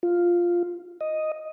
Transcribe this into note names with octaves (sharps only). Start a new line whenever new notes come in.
F4
D#5